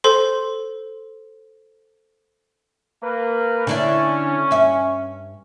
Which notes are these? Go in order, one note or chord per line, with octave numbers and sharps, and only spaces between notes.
A4 C5 C6
A#3 A#4 B4
D3 C#4 D4 E4
G2 E5